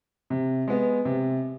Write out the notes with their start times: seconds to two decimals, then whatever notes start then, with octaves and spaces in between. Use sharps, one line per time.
0.30 C3
0.68 G#3 B3
1.05 C3